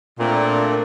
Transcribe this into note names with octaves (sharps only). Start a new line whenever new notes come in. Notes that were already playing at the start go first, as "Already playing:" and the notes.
A#2 A3 C4 D4